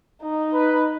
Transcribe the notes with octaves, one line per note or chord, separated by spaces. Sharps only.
D#4
B4